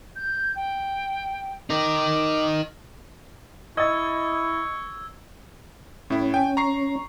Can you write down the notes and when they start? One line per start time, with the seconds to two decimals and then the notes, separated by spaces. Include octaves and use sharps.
0.16 G6
0.56 G5
1.70 D#4 A#4 D6
3.77 E4 D#5 C#6 E6 G#6 A6
6.10 A2 C#4 E4
6.34 G5 G#5
6.57 A#5 C#6 C7